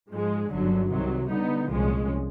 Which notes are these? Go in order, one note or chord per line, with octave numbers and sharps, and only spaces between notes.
G#2 F3 G#3
G1 F#2 D3 F#3
C2 C3 D#3 F#3
D3 G3 B3 D#4
C2 A#2 F3 G#3 C#4